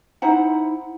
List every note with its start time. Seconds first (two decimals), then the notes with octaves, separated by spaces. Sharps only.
0.22 D#4 E4 C5 F#5